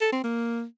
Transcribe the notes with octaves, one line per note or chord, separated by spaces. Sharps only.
A4
C4
A#3